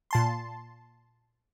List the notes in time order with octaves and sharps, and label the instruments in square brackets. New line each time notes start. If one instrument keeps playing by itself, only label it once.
[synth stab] A#2 A5 C6